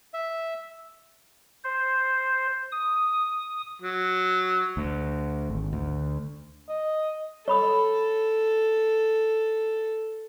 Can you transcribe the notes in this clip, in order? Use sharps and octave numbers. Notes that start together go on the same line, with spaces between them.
E5
C5
D#6
F#3
D2
G#1
D2
D#5
A4 C#5 B5 D#6